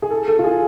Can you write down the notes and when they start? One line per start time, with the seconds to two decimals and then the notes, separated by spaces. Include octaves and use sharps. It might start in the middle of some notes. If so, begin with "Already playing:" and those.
0.02 G#4
0.11 A4
0.28 A4
0.39 F4
0.44 G#4